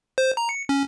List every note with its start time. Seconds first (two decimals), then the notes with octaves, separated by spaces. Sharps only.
0.18 C5
0.37 A#5
0.49 C#7
0.69 C#4